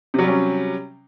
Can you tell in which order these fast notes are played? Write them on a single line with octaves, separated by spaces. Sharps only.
C3 F#3 G3 C#4